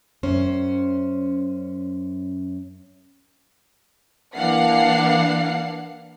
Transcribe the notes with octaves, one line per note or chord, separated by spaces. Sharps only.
F#2 C#4 C5
E3 A#3 D4 F5 F#5 C7